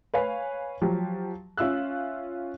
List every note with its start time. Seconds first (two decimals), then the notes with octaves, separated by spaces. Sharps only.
0.14 B4 C#5 F5 G#5
0.82 F3 F#3 G4
1.57 C#4 F4 E5 E6 F#6